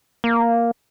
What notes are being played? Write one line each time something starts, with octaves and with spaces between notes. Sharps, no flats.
A#3